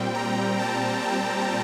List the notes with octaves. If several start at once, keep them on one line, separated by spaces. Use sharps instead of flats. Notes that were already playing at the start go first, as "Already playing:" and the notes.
Already playing: A#2 G3 C4 G5
A#5
A5
G5